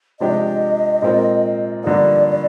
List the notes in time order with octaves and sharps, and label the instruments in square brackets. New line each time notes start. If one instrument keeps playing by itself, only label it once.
[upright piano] C3 F3 G#3 D4 G4 [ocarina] D#5
[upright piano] A#2 G#3 C4 F4 A#4
[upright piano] G2 D3 F3 A#3 D#4 [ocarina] D5